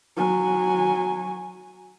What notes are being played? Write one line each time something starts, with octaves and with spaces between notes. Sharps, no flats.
F#3 G#5